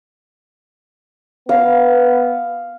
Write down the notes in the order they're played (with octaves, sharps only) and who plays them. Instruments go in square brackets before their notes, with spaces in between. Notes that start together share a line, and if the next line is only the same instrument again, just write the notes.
[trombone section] B3 [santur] F5